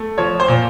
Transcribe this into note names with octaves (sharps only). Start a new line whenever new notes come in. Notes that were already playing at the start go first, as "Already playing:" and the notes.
Already playing: A3
F3 C#5
C5
A#2